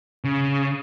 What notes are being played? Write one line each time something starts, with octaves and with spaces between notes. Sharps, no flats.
C#3